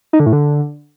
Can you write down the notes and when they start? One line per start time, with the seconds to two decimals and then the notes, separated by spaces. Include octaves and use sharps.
0.13 D#4
0.20 D3
0.26 A2
0.33 D3